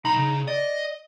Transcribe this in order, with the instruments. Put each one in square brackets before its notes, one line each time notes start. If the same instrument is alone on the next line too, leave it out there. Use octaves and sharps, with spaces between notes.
[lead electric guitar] B1 B5 [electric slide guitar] D#4 A#5
[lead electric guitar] C#3
[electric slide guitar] D5 [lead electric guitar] D#5